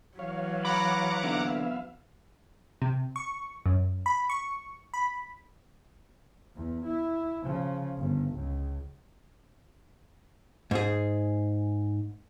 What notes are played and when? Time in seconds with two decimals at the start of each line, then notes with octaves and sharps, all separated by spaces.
0.19 E3 F#3 C#5 F5
0.65 F#5 A#5 B5 D6
1.24 A#2 D3 B3 E5 F5
2.82 C3
3.16 C#6
3.66 F#2
4.06 B5
4.30 C#6
4.94 B5
6.56 E2
6.85 E4
7.43 C#3 F3
7.98 G1
8.36 C#2
10.71 G#2 G#4